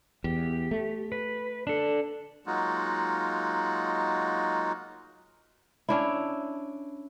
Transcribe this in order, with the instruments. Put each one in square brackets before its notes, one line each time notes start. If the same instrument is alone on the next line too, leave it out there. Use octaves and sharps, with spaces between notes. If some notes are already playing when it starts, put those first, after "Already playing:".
[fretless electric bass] E2 [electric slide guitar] G4
[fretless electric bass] A3
[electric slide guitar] B4
D4 A4
[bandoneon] F#3 G#3 A#3 D#4 F4 F#4
[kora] C#4 D4 E4